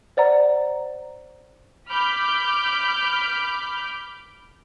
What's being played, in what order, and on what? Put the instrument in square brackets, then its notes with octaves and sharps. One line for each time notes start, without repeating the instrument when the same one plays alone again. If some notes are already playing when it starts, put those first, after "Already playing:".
[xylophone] C5 D5 F#5 A#5
[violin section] B5 D6 F6 G6